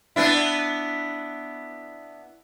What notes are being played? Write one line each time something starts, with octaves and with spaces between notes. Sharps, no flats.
B3 D4 E4